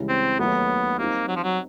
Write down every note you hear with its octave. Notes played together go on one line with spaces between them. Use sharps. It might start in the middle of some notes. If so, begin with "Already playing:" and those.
Already playing: C#2 C#3 E3 G3
C4
D#2 D#3 F#3 A3 B3
G3 A#3 C4 D#4
F#3
F3
F#3